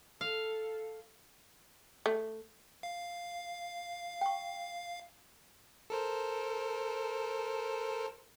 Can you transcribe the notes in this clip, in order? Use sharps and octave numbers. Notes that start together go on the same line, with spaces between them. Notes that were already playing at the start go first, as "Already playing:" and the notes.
A4 F5
A3
F5
G5 C#6
A4 A#4 C5